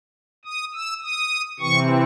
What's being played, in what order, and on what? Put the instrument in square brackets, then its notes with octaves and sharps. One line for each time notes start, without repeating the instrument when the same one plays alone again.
[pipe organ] D#6
E6
D#6
C3 E3 C4 C#6